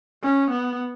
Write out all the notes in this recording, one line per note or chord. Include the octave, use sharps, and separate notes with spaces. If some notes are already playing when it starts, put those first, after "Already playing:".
C#4
B3